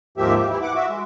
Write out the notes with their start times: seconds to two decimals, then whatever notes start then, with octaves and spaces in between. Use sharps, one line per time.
0.18 D#2 G#2 F3 A#3 G4 E5
0.37 G4
0.50 E3 E4
0.62 F#5 D6
0.75 F#4 E5
0.89 G#3